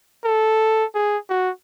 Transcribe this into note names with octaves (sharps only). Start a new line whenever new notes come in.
A4
G#4
F#4